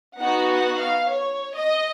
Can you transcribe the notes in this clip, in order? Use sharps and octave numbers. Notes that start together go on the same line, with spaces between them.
B3 D#4 F#4 F#5
F#5
F5
C#5
D#5